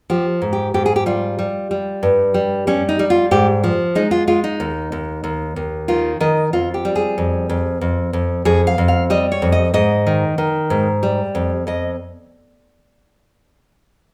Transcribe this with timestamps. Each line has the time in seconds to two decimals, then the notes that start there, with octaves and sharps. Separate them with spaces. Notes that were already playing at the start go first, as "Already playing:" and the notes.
0.10 F3 G4
0.42 G#2
0.53 G4
0.74 G#2 G4
0.86 G#4
0.96 G4
1.06 G3 F4
1.39 G3
1.71 G3
2.03 G2
2.34 G3
2.67 G3 C#4
2.89 D#4
2.99 G3
3.10 F4
3.31 G#2 G4
3.64 F3
3.95 G#3 D#4
4.11 F4
4.27 G#3 F4
4.44 D#4
4.60 D#2
4.92 D#2
5.24 D#2
5.56 D#2
5.88 D#3 F4
6.20 D#3 D#5
6.53 F2 F4
6.74 G4
6.85 G3
6.96 G#4
7.18 F2
7.49 F2
7.81 F2
8.13 F2
8.45 F2 G#4
8.67 F5
8.78 F2
8.88 F5
9.10 G3 D#5
9.32 C#5
9.42 F2
9.52 D#5
9.74 G#2 D#5
10.07 D#3
10.38 D#3
10.70 G#2
11.03 G3
11.35 F2
11.67 F2 D#5